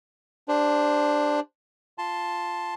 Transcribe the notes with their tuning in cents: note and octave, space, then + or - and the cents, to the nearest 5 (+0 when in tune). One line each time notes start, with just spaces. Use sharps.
D4 +5 G4 +25 C5 -5
F4 +0 A5 +0 C6 +0